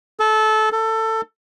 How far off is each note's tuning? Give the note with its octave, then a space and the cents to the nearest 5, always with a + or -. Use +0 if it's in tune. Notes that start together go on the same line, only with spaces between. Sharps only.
A4 -20
A4 +20